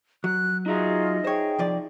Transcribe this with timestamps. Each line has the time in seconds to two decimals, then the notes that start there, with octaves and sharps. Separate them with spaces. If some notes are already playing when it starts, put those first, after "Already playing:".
0.24 F#3 F#6
0.66 D#4 F4 F#4 G#4 D#5 E5 A#5
1.25 G#4 C5 C#5 G5
1.59 C2 F3 D5